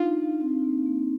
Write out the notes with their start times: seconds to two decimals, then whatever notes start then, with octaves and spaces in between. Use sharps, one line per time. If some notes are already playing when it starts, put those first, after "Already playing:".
Already playing: D4 D#4 F4
0.19 D4
0.41 C4
0.64 A#3
0.86 A#3